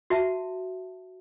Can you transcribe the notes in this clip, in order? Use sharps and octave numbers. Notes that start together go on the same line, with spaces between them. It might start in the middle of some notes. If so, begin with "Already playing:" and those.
F#4 E5 A5